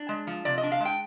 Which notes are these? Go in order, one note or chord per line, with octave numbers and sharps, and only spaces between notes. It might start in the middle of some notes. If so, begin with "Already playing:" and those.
Already playing: D4
G#3
F3
C3 D5
D#5
D4
F5
G#3
G5